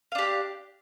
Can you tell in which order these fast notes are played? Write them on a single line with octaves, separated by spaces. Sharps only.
F5 D4 G4